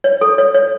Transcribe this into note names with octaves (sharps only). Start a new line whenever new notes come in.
C#5
A4
C#5
C#5